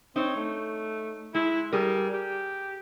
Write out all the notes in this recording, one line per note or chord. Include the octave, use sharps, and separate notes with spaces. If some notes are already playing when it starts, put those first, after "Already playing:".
C4 D#4 C#5
A3
G#3 E4
G3 G#4 A#4
G4